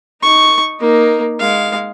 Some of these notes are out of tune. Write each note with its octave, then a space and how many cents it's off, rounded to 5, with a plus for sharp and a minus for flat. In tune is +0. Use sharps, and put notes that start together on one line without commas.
D#4 +5 C#6 +0
A#3 +10 D#4 +0
G#3 +0 F5 +0